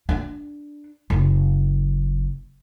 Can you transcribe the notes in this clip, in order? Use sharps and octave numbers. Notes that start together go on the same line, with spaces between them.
D4
F#1